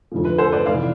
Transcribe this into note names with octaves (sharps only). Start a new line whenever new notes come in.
F2 D3 F3
B4
A4 C5
B4 D5
F2 C3 E3 D5 F5